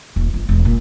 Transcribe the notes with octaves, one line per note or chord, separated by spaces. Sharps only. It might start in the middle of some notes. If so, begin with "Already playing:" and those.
D#1
G1
E1
A#2